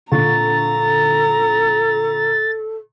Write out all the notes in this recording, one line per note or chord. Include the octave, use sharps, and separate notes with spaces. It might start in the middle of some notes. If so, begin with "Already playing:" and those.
A#2 D3 A4 A#5 C#6 A6